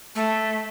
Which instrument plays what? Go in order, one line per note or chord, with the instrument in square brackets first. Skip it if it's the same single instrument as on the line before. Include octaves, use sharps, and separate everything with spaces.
[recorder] A3